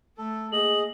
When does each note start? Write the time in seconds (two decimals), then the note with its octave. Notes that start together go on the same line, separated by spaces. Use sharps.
0.18 A3 A4
0.52 A#3 G#4 D#5 F#7